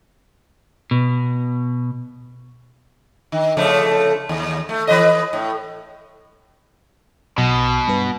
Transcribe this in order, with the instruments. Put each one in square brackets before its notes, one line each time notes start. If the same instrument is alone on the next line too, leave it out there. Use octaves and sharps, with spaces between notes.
[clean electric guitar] B2
[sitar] D#3
C#3 F3 A3
D#2
A3
E3 B4 D#5
A2
[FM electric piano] B1 [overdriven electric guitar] B2
[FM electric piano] G2 B4